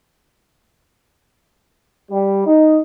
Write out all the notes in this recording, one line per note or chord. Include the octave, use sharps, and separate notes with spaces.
G3
D#4